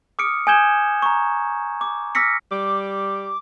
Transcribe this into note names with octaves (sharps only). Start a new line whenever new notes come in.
D6 D#6 F6 C#7 D7
G#5 D#6 G6 G#6 E7 G7
A#5 C#6
D6
D6 E6 F6 A#6 B6 C#7
G3 D6